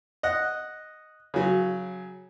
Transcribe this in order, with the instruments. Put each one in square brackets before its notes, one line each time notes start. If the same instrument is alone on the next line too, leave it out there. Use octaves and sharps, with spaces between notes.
[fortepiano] D#5 F#5
C#3 F#3